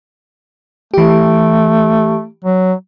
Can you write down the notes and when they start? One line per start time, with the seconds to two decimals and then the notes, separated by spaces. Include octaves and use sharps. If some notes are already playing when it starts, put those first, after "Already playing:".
0.94 E3 A3 G4
2.45 F#3